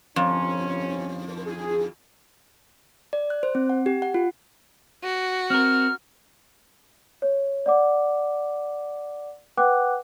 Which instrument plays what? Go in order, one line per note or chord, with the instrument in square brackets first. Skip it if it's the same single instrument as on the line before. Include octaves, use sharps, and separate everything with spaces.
[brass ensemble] G1 C2 C#4 [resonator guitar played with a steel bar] F2
[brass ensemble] G#4
[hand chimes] D5
F#6
C5
C4
F#5
G4
F#5
F4
[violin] F#4
[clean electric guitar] C4 A#4 [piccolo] F6
[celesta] C#5
D5 F#5 D6
B4 F#5 G5 D6 F#6